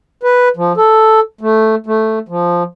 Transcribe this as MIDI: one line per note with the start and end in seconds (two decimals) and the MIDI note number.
0.23 0.49 71
0.57 0.72 53
0.77 1.20 69
1.41 1.75 57
1.86 2.19 57
2.29 2.63 53